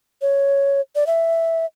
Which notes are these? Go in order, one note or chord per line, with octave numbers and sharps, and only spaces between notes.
C#5
D5
E5